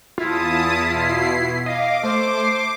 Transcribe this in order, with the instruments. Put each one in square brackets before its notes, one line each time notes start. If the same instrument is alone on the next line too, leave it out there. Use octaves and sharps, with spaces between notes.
[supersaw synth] E2 A5 D#6 [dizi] E4 [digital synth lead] F4
[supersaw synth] B2 C7
[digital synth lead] D#5 [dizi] F5 [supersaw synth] D6
[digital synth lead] A3 [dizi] C5